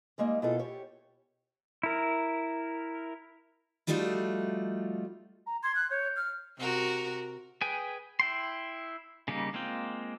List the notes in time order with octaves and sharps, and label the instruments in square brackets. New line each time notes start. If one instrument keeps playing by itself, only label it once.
[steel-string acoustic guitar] G3 G#3 A#3 D#4
B2 E4 F4 G#4 A4
G4 C#5
[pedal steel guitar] E4 A#4
[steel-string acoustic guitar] F3 G3 A3 D#4 F4 F#4
[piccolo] A#5
[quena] C6 [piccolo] G#6
[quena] F#6
[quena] C#5 [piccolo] G6
[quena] F6
[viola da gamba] C3 F#4 A#4
[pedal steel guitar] G#4 B4 G5 G#5
E4 G5 C6
C#3 G3 A#3 D#4
G#3 A#3 C4 F4 G5